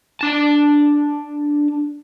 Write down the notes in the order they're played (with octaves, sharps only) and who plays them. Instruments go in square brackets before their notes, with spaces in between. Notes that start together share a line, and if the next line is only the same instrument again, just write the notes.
[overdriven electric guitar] D4 A5